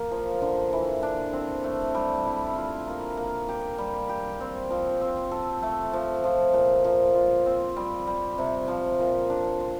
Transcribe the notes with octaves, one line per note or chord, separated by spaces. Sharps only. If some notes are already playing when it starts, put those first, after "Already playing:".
Already playing: A#3
F3
D3
E3
D4
C4
A3
G3
E4
F4
A#3
A#3
G4
G3
G4
C4
F3
C4
A4
A3
F3
F3
A#2
F3
F4
C4
G3
G3
C3
F3
A#2
D4
C5